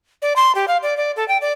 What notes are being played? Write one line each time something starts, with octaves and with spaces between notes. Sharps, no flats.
D5
C6
G4
F5
D5
D5
A4
G5
D5